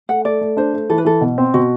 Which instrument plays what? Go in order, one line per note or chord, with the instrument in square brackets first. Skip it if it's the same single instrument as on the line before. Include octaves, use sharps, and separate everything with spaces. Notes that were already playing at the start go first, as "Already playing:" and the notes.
[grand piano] A3 [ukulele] F#5
[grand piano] A3 [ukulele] D5
[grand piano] A3
[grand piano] D4 [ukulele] C5
[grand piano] A3
[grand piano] E3 [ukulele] A4
[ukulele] B4
[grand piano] E3 [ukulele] A4
[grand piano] B2
C4
[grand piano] B2 [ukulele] F#4